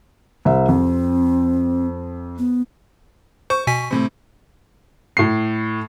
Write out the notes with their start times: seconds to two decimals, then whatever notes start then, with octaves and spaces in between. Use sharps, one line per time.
0.45 C2 C5 E5
0.69 F2 C4
2.38 B3
3.50 C5 C#6
3.67 B2 G#5 B6
3.91 A2 C3
5.17 A2 C7